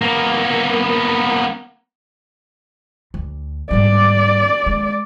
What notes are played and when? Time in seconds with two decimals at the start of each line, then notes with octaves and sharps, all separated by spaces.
0.02 A#3 B3
3.14 D2
3.71 G#2 G3 D5
4.66 G#3